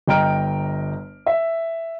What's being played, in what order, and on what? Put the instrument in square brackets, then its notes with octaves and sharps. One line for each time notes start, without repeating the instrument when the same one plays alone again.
[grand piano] G1 D#5 G5 A#5 F6 D7
E5